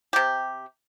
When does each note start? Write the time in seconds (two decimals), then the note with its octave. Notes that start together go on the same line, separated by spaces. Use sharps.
0.13 C3 G4